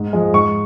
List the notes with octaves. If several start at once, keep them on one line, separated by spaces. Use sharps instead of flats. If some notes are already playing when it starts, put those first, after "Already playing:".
Already playing: G#2
F3 G#3
G#2 C#6